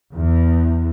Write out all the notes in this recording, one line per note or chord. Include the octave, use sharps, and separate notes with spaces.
E2